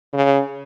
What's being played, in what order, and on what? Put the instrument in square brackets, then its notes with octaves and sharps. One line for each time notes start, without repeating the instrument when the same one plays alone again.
[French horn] C#3